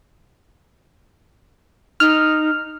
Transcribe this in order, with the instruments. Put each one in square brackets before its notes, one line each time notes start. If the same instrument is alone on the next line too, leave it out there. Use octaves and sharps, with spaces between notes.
[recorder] D#4 [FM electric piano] F6